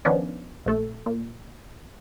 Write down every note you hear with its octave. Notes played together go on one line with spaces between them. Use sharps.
D#3 F3 B3 C#4 D4
A#1 A3 A4
A#2